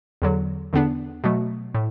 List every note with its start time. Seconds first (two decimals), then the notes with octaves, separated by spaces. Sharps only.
0.22 E2 D3 F#3
0.73 E2 D3 B3 D4
1.24 B2 F#3 A3
1.74 A2